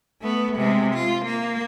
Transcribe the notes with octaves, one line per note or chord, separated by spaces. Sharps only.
A3 B3
C3 G#3
F4
A#3